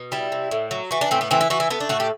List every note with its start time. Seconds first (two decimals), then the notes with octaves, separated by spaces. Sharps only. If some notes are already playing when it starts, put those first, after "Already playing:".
Already playing: B2
0.12 G3 E4
0.32 C3
0.51 A2
0.71 F#3
0.91 E3 F#4
1.01 D4
1.11 A2 C4
1.21 B3
1.31 E3 C4
1.41 E4
1.50 E3 F#4
1.60 E4
1.70 A3 B3
1.80 D4
1.89 A2 F#4
2.00 G4